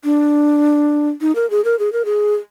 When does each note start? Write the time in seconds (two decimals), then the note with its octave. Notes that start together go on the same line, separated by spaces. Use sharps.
0.04 D4
1.21 D#4
1.35 A#4
1.50 G#4
1.65 A#4
1.79 G#4
1.93 A#4
2.05 G#4